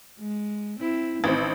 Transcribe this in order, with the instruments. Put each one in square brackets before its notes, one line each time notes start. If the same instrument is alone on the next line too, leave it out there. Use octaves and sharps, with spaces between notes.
[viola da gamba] G#3
C4 E4
[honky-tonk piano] A1 C4 [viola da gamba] D#3 E4